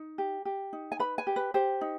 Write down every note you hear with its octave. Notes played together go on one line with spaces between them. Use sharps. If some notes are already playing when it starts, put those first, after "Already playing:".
Already playing: D#4
G4
G4
D#4
G#5
B4 B5
G#5
G4
B4
G4 C5
D#4